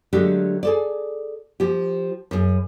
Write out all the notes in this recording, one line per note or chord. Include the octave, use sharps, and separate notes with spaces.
D3 F#3 G#3 A3 D4 G4
G#4 A4 D5
F3 G4
F#2 G#4